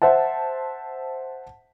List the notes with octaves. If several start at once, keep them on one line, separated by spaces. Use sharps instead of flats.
C5 E5 F#5 A5